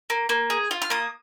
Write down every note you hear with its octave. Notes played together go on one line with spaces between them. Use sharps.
A#3
A#3
G#4
F4
F6
A#3 D#6